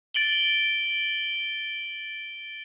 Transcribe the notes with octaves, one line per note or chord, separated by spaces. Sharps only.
A6 D7 F#7 G7